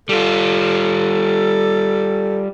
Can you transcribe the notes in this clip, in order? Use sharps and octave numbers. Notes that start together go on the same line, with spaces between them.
G3 F4 A4